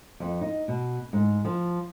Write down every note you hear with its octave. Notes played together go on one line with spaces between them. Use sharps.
F2
D#4
B2
G#2
F3